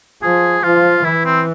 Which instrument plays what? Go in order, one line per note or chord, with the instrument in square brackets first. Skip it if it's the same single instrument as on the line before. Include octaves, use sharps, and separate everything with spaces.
[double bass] F3 [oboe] G#4
[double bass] F3 [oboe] F4
[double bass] E3 [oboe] E4
[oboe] C4